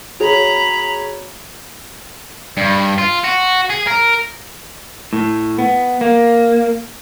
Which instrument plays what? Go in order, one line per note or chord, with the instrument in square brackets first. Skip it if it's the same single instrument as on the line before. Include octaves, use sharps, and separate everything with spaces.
[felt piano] F#4 G#4 C#5 [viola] A#5 B5
[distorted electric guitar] G2
F4
F#4
G#4
A#4
[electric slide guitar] A2
B3
A#3